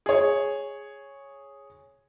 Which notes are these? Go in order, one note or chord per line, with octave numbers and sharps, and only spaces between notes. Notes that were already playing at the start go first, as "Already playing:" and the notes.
G#4 C#5